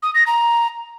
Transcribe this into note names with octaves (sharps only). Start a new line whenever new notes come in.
D#6
A#6
A#5